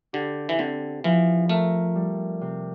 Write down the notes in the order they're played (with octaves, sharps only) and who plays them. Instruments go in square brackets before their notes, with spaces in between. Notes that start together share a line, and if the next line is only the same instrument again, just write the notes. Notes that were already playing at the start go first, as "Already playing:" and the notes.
[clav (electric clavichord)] D3 [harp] G4
[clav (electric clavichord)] E3
[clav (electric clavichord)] D3 [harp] C4
[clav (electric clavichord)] E3 [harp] F3
[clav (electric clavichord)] A3 [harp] A#4
[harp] G3
C3